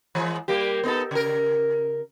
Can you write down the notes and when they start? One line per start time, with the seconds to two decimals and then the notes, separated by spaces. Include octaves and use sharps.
0.15 E3 G#3
0.48 G3 A#3 G4
0.84 B3 D#4 A4
1.11 C#3 A#4